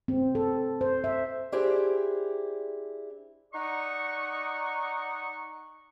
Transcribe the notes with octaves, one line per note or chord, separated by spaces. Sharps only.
C4
A4
C5
E5
D4 E4 G4 G#4 C5
D#4 D5 D#5 F#5 C#6